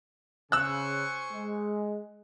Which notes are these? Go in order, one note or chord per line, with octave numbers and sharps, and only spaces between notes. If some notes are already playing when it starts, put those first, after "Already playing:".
C#3 C5 G#5 C#6 E6 F#6
G#3